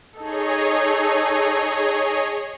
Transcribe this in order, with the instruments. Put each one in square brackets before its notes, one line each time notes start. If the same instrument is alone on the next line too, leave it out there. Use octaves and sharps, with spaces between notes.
[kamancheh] D#4 A4 [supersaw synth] G#4 C#5 D#5